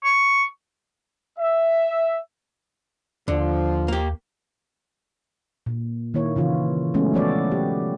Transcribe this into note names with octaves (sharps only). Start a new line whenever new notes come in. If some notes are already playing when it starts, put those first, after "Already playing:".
C#6
E5
D#2 D3 F3
A#3 G4
A#2
D#3 A#3 E4 C#5
C#3 E3 F4
F#3 G#3 A3 B3 C#4
F3 A3 B3 A4 C#5 D5
G4